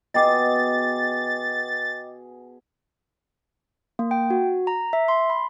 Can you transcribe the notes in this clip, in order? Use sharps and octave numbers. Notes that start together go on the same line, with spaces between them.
B2 G#4 D#5 G5 D6 A6
A#3
G5
F#4
A#5
E5
C6
B5